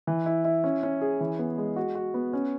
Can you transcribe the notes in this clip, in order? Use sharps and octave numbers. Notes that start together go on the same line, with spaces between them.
E3
E4
E4
C#4
C#4
G#4
E3
B3
G#3
F#4
F#4
B3
C#4